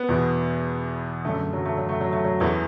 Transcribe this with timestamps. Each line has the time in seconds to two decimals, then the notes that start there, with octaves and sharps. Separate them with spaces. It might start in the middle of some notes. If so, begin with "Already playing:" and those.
Already playing: B3
0.09 E2 B2
1.25 F#2 D3 A3
1.53 F#3
1.66 A3
1.78 F#3
1.89 A3
2.01 F#3
2.13 A3
2.25 F#3
2.40 E2 E3 A3